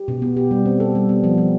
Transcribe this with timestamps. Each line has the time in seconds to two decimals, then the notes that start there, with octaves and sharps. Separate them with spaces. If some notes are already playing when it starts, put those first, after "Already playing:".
Already playing: G4
0.08 B2
0.22 B3
0.37 G4
0.51 G3
0.66 C4
0.80 A4
0.95 G3
1.09 B3
1.24 F3
1.38 F3